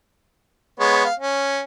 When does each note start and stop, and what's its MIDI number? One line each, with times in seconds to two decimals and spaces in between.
0.80 1.05 56
0.80 1.05 59
0.80 1.05 73
1.05 1.14 77
1.19 1.61 61